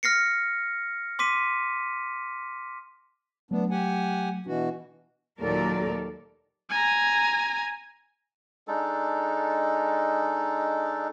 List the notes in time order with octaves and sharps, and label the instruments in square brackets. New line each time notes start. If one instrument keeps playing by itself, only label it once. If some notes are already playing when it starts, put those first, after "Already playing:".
[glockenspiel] F6 A#6 C7 C#7
C6 D6 B6 D#7
[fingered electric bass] F#3 A3 [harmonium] B3 D4
[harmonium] G4 F#5 G#5
[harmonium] B2 E3 F#4 [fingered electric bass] D4
[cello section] D#2 A#2 F#3 A4 A#4 D5
[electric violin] G#5 A#5
[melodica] G#3 D4 D#4 A4